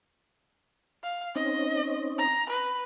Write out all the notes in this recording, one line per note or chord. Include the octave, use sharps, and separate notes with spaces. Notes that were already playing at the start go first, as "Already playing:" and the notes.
F5
C4 C#4 D#4 D#5
A#5
B4